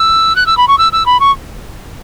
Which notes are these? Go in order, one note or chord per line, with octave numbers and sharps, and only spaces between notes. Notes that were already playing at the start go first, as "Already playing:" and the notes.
Already playing: E6
F#6
E6
B5
C#6
E6
E6
B5
C#6